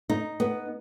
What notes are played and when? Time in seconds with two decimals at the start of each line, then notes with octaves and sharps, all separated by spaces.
0.09 D#4
0.40 B3